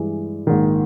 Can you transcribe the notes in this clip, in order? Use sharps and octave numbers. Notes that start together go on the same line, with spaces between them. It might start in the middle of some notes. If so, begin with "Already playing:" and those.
Already playing: G2 E3 G#3
A#1 G#2 D#3